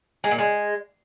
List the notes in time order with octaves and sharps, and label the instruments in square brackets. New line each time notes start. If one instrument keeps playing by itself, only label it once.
[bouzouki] G#3
A#2
G#3